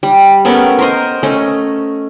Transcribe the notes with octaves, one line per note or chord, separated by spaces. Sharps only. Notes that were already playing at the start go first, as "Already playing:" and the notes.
G3
A3 B3 C#4 A#4
A#4 C5 D#5
A3 C#4 D#5